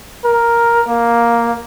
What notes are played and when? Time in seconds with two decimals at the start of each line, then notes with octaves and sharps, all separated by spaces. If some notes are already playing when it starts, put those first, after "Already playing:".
0.25 A#4
0.88 A#3